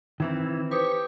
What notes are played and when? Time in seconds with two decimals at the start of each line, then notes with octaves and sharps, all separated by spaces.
0.20 D#3 E3 C4 E4
0.71 G4 B4 C5 C#6 D#6